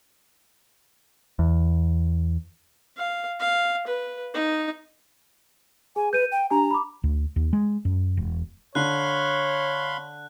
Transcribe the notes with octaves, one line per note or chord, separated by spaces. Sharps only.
E2
F5
F5
B4
D#4
G#4 G#5
B4 G6 D#7
G5
D4 G4 G#5 A#5
B5 D6
D2
D#2
G#3
F#2
E1
D3 C#5 F5 B5 C6 F#6